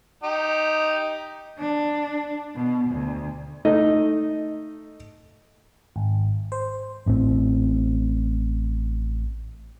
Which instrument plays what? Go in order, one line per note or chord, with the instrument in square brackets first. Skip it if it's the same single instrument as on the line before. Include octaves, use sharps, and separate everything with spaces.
[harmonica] D#4 G4
[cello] D4
B2
D2
[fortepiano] A3 D#4 D#5
[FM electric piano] G#1
C5
[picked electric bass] A1 A2 C3 C4